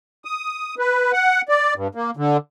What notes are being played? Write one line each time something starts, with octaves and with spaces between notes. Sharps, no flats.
D#6
B4
F#5
D5
G2
A#3
D3